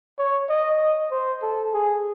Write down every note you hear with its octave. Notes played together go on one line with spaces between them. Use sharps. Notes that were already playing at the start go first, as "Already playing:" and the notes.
C#5
D#5
C5
A4
G#4